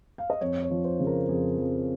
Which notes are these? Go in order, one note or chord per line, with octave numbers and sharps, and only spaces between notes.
F5
D#5
F2 C#5
C#5
F3
C5
C#3
A#4
F2 G#4
F2